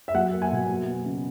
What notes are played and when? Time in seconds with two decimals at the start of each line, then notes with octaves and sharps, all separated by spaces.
0.08 E5
0.14 F#3 F#5
0.33 A#3
0.42 G#5
0.51 B2
0.69 F#3
0.87 B3
1.06 C#3